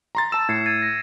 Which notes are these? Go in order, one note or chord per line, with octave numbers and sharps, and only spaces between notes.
A#5 C6 A6
A5 E6 E7
A2 G#6 C7 C#7
G#6 A6 D#7
A#6